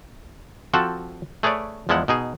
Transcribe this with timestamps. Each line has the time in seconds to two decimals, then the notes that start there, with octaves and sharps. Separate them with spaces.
0.74 F3 C4 F#4 A4 A5
1.43 A3 G#4 B4 C#5 D5
1.89 E2 F3 G#3 E4 F#5
2.08 B2 D#4 G#4